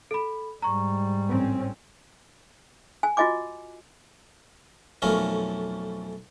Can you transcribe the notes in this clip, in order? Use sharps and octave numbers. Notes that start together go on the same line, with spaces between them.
A4 B5
G#2 G3 A#5 C#6
A1 C4 C#4
G#5
F4 F#4 D#5 G#5 D6
B1 F2 A3 C#4 A#4 F5